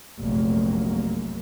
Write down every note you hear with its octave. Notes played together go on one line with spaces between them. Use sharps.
F1 A#1 F#2 A#3